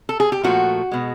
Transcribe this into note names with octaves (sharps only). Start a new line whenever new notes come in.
A4
G#4
G4
A#2 F3 A3 F#4
B2 G#3